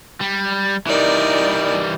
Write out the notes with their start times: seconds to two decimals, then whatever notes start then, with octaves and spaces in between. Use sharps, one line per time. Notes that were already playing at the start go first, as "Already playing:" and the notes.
0.21 G3
0.87 E3 G3 D#4 A#4 D5